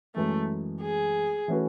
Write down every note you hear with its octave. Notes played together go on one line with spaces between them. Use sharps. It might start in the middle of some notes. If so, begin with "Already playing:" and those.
F#2 E3 G#3 A3
G#4
E3 A3 C#4 F#4 B4